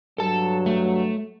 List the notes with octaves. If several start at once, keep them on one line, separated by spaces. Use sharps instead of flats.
G2 F#3 A4 A5
A3